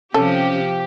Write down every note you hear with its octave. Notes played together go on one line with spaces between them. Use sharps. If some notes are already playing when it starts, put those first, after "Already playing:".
C3 F3 C#4 G4 A4